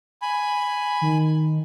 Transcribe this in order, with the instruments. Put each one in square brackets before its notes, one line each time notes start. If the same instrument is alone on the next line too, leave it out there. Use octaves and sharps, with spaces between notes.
[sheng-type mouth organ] G#5 B5
[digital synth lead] D#3